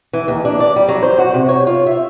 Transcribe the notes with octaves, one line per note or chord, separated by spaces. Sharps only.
E3
D#2
D4
D5
G3
F#3
C5
F#4
C3
C#5
F4
E5